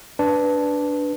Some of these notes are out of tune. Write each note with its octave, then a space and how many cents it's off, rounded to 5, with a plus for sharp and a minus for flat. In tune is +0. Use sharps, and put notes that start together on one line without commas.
D4 -10 B4 +0